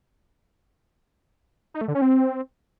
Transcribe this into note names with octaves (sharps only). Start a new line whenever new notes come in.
D#4
A3
D3
C#4
C4